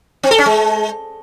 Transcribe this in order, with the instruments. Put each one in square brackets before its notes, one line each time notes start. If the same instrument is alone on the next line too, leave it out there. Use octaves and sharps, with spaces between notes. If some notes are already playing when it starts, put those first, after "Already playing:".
[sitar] C4
A4
C#4
G#3